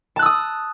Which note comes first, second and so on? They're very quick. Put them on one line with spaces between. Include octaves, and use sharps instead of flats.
A5 F#6 E6 D#6